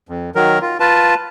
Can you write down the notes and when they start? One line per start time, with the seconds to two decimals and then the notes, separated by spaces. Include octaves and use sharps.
0.09 F2
0.35 D#3 F#3 A#4
0.62 F4
0.80 F4 B4 A5